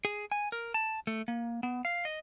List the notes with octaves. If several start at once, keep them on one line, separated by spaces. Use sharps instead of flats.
G#4
G#5
A#4
A5
A3
A#3
B3
F5
D#5